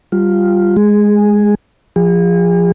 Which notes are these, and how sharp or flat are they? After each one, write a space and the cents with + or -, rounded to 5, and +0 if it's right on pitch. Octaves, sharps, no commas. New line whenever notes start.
G3 +0 F4 +0
G#3 +0 G#4 -5
F3 +0 G#4 -35